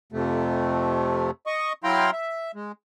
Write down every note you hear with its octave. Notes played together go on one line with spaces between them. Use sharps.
F2 C3 A3
D#5 C#6
F#3 E4 F5 G5 A#5 C6
E5
G#3